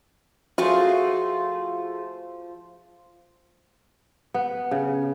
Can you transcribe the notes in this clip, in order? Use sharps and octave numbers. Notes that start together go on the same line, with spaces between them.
F3 A3 F4 F#4 G#4 C5
B3
C#3